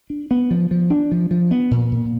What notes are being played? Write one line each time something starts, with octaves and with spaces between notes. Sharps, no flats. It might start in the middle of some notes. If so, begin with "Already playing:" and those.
D4
B3
F3
F3
D4
F3
F3
B3
A#2
A#2